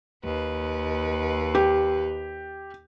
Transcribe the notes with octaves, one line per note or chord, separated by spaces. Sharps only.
D#2 B4
G4